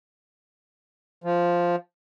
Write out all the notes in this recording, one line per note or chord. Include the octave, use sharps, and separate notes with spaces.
F3